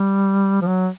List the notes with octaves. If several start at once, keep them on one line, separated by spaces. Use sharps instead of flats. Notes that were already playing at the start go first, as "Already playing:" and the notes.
Already playing: G3
F3
F#3